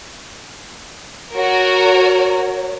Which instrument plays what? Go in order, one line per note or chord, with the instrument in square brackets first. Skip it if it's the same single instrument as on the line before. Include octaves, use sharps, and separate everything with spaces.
[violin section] F#4 A#4 [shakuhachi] C#5